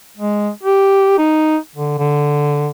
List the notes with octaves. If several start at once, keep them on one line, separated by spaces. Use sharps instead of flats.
G#3
G4
D#4
D3
D3